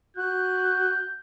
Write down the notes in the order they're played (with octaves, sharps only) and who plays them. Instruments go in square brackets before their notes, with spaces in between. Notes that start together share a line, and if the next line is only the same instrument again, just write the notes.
[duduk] F#4 [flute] F#6 [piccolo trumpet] G6